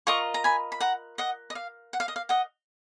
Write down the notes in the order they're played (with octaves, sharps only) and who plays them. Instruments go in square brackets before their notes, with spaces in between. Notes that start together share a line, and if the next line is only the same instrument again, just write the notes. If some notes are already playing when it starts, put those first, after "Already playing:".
[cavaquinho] F4 A#4 D#5 A#5 C#6
A#5
G#5 B5
B5
F#5 A#5
D#5 F#5
D#5
F5
F#5
F5
D#5
F5
D#5 F#5